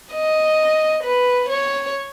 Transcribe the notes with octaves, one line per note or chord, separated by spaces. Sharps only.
D#5
B4
C#5